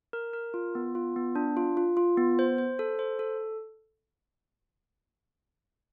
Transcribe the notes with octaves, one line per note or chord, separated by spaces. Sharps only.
A#4
A#4
F4
B3
F4
B3
D4
F4
F4
F4
B3
C5
C5
A4
C5
A4